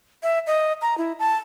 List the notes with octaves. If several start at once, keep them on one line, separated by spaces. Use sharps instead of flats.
E5
D#5
A#5
E4
A5